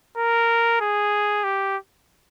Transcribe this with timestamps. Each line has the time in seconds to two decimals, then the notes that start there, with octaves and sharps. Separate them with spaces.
0.18 A#4
0.81 G#4
1.44 G4